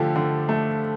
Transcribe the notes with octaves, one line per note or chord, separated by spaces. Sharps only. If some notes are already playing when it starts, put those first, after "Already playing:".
Already playing: D3 F3 A3 G4 A4
D3
A3